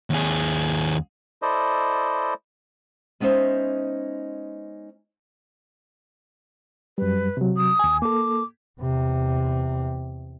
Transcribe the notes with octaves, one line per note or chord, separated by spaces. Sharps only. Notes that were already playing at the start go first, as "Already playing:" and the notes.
D#2 G#4
E4 A4 C5 D5 D#5
G#3 B3 C#4 D#4 C5 E5
F#2 G3 B4
C3 F#3
D#6
D#2 G#5
A#3 A4 D6
E2 C3